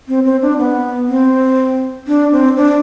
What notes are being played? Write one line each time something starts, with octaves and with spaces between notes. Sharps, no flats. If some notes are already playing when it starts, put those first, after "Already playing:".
C4
C4
D4
B3
C4
D4
C4
D4